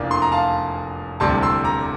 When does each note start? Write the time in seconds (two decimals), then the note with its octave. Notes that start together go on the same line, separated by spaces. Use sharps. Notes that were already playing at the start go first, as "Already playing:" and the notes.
Already playing: F1 E2 E3 A#3 D4 D5 F5
0.11 C6
0.22 A#5
0.32 F5 A5
1.20 E1 D2 C3 G3 D4 A5 C6
1.42 C6 E6
1.64 A#5 D6